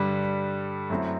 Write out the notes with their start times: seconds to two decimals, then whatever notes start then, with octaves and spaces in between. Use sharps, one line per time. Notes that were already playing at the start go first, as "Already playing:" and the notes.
Already playing: G2 D3 G3
0.90 F#2 F#3 A3 C4 E4